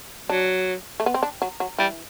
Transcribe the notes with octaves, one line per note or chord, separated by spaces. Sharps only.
F#3 D4
A3
B3
C4
D4
F#3
F#3
E3 G3